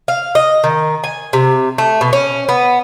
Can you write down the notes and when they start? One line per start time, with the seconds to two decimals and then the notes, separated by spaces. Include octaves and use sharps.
0.08 F5
0.35 D#5
0.64 D#3
1.04 G#5
1.33 C3
1.78 A3
2.01 B2
2.13 C#4
2.49 B3